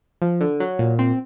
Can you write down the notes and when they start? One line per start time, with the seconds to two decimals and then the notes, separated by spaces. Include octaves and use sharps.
0.22 F3
0.41 D3
0.60 F#3
0.79 A#2
0.99 C4